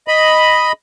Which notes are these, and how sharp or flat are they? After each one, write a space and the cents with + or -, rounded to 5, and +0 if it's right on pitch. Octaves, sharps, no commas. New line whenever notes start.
D#5 +0 B5 +0